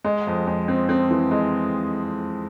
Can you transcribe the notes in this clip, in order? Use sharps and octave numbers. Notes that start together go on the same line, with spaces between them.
G#3
F2
G#3
C4
C4
E3
G#3